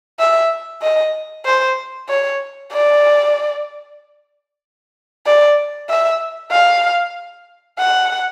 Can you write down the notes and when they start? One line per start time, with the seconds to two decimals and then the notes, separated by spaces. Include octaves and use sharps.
0.19 E5
0.82 D#5
1.46 C5
2.09 C#5
2.72 D5
5.26 D5
5.90 E5
6.52 F5
7.79 F#5